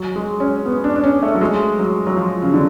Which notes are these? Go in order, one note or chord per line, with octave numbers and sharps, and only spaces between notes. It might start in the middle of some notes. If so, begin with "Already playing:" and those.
Already playing: F#3
G#3
C#4
B3
D4
D4
C#4
A3
F#3
G#3
F#3
F#3
F3
C#3
D3